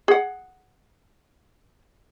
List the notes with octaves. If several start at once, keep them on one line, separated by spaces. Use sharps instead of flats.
G#4 F#5